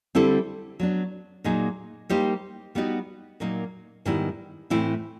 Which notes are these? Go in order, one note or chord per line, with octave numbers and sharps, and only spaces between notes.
D3 G3 C4 E4 A4
F#3 B3 D4
A#2 F#3 A#3 D#4 G#4
G3 A#3 D#4 G4 C5
G3 B3 D#4 F#4
A#2 F#3 A#3 D#4
G#2 D#3 G3 B3 E4
A2 E3 A3 C4 E4